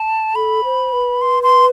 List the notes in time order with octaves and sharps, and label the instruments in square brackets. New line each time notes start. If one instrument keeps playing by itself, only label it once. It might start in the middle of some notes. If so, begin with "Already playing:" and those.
Already playing: [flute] A5
[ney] A4 [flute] B5
[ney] C5
B4
[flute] C6
C6